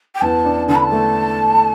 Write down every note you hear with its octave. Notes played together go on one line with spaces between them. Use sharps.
G5
E2 A5
D4
D3 A5
B5
A5
A3